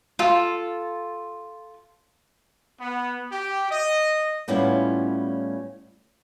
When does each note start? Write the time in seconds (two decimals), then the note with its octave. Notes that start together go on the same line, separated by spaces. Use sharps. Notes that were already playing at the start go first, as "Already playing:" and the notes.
0.19 F4 A4
2.78 B3
3.30 G4
3.69 D#5
4.48 A2 G3 B3 C#4 E4 F4